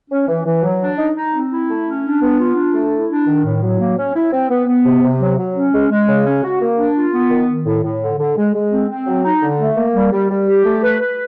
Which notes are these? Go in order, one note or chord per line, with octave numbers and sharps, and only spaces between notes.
C#4
E3
E3
F#3
D4
D#4
D#4
C4
E4
A3
C#4
D4
B3
F4
D4
A3
E4
D4
D#3
A2
F#3
A#3
C#4
E4
C4
B3
B3
C3
C3
F#3
F#3
C#4
G#3
G#3
C#3
C#4
F#4
A#3
D4
F4
B3
D#3
D#3
A2
A2
D3
D3
G#3
G#3
C4
C4
F#3
D#4
D3
A3
A#3
G3
G3
G3
G4
A3
B4
B4